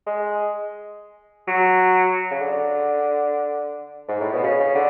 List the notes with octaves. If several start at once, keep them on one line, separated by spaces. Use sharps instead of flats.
G#3
F#3
C#3
D3
G#2
A2
B2
C#3
C#3
D3